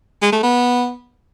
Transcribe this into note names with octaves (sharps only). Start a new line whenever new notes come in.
G#3
A3
B3